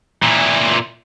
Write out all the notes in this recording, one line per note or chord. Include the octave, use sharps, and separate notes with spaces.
A#2 E3